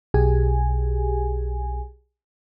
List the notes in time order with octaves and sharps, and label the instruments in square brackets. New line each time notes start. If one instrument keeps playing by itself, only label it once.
[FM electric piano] B1 B2 G4 G#4 G#5